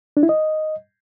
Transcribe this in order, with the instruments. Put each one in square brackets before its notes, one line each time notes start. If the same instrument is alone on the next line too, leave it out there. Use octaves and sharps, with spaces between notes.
[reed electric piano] D4
E4
D#5